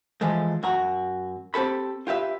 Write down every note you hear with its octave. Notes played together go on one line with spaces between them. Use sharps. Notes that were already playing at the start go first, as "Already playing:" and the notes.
E3 F3 G#3 A3
F#2 F#4 A#5
C4 G4 A4 B5
F4 G4 B4 E5